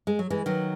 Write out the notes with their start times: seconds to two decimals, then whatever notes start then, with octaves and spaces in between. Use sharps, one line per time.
0.07 G#3
0.19 F#3
0.30 E3 G#3
0.46 D#3 F#3